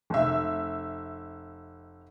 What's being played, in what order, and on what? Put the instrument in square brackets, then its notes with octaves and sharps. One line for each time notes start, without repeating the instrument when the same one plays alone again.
[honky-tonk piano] F1 E5